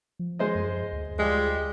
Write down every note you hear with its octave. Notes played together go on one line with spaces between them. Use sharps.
F3
G#3 C5 D#5
F#2
D2
F3 G3 G#3 G#4